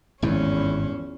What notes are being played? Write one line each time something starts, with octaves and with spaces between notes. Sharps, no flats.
G#1 E2 G2 E3 F3 C#4